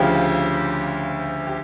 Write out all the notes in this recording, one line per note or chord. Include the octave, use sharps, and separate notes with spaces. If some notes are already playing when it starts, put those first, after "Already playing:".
Already playing: D2 C#3 F3 G4
G4